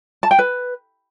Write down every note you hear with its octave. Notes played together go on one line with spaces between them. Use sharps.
A5
G5
B4